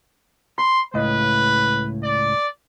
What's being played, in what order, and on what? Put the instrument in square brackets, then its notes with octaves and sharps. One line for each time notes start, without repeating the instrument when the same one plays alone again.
[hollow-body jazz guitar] B5 [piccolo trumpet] C6
[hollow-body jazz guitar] C#2 A2 D#5 [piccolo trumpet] B4
[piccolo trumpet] D5